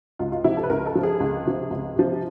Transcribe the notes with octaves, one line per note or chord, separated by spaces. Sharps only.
C#2 F4
F4
C3 F3 E4
A4
B4
C#2 A#4
A4
C3 F3
G#4
C#2
C3 F3
C#2
C3 F3